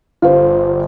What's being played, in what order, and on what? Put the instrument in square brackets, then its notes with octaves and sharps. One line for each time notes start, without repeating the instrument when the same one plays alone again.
[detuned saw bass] G1 [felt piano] F4 C5